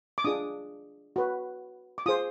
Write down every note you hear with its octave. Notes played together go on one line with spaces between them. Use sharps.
D6
D4 F4 G#4 D#6
F#4 B4
D6
F4 G#4 C5 D#6